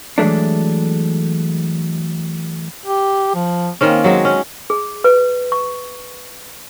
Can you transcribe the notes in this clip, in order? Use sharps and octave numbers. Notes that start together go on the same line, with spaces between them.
E3 F#3 G#3 A3 D4
G4
F3
D#3 A#3 C4 C#4
F#3 G#3 C4
C#4
G#4
B4
C#6